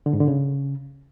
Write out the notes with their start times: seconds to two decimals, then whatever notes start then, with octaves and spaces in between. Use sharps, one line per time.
0.06 D3
0.13 G#2
0.21 D3
0.28 C#3